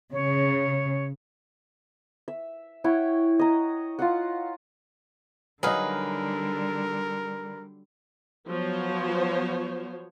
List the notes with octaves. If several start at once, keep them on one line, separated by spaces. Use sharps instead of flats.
C#3 C#5
E5
E4 C#5 F#5 G5
D#5 A#5
F4 F5 F#5
D3 F#3 G3 D#4 G#4 A#4 B4 F5
F3 F#3 B3 C5 C#5